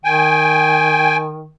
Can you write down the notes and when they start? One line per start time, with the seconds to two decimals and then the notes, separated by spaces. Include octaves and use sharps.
0.05 D#3 G5 G#5